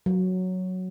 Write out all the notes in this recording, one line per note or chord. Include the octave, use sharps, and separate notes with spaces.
F#3